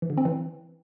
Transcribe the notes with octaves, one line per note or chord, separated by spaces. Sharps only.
E3
D3
C4
E3